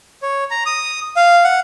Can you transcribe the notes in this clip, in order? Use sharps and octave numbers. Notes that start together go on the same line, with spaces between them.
C#5
A#5
D#6
F5
F#5